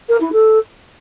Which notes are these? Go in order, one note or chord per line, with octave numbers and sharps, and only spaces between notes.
A#4
E4
A4